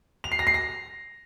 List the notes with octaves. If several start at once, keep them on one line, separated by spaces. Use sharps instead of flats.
F7
C7
A#6
C7
A#6